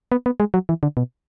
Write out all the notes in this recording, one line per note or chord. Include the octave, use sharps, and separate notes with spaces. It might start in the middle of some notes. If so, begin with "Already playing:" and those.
B3
B3
G#3
F#3
E3
D3
B2